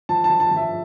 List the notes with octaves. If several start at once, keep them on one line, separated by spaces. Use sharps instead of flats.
F3 A5
A5
F3
A5
F3 E5